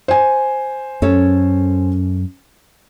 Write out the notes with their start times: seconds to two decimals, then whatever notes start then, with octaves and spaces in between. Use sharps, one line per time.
0.08 C5 G#5
1.02 F#2 C#4 A4 C#5